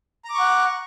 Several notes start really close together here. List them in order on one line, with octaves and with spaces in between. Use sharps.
A#5 D6 C#6 F#5